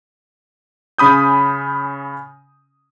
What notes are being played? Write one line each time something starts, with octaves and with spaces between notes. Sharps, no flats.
C#3 C#4 B5 D#6 G6